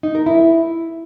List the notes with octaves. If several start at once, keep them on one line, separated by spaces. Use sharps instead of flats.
D#4
A#4
E4